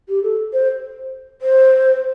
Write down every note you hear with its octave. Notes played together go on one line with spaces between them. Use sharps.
G4
A4
C5
C5